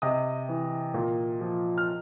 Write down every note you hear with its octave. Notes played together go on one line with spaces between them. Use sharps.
C3 D#5 D#6
E3
A#2
F3
F6